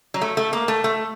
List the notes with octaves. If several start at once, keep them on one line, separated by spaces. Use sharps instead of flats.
F#3
A3
A3
A#3
A3
A3